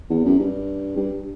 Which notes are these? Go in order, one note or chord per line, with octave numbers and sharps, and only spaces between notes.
E2
F#2
G2
G2